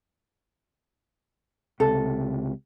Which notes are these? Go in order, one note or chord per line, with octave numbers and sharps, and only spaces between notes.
C#2 C3 A4